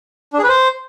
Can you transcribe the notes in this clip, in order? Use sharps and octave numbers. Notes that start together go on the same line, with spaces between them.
D4
G#4
B4
C5